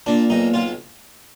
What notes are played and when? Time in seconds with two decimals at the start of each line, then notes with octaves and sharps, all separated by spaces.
0.06 A#2 D4
0.30 B1 D#4
0.54 B1 F4